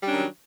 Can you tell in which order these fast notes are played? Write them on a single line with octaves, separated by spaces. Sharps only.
G3 D4 C#4 D#3 F#3